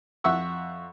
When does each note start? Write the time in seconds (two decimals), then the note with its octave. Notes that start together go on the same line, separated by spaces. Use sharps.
0.24 F2 E5 F#5 C#6 E6